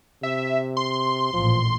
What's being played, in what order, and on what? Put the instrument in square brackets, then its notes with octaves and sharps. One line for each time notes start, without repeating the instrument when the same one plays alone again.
[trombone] C3 [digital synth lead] E5
[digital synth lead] C6
[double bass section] A1 A#2 [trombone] F3